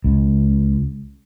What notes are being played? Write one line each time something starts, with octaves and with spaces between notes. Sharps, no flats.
C#2